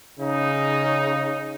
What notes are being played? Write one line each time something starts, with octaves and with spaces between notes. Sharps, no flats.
C#3 D#4